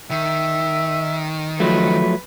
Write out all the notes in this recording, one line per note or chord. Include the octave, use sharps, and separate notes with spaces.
D#3 E5
F3 F#3 A3 B4